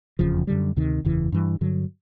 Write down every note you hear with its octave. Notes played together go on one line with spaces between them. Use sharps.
F1 E2 C#3 F3
F#2 D3 G3
D2 C3 D#3
F#1 E2 C#3 E3
G2 E3 G3
G2 D3 F#3